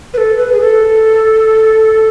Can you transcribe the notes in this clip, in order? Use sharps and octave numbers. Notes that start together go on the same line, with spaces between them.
B4
A4
B4
G#4
A4